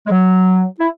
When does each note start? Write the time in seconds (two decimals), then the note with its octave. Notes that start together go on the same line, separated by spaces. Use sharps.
0.07 G#3
0.11 F#3
0.80 E4